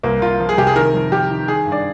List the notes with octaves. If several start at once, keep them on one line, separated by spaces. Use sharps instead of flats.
C2 A#3
C2 F4
F3
G#4
C3 G4
G#4
D#3 A#4
F2
F2 G4
D#3
D#3 G#4
G2
D5